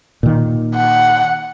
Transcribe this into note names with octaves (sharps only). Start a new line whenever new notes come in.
A#2 D#3
F#5